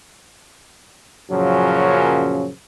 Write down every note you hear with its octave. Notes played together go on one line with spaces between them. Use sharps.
F#2 A#2 C#3 F3 F#3 C#4